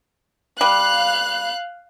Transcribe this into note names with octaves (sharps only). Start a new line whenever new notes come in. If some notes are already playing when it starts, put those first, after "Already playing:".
G3 F5 F#6